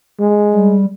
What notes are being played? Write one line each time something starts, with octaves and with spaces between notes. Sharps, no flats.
G#3
G3